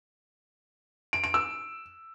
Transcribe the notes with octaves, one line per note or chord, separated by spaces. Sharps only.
D7
D7
E6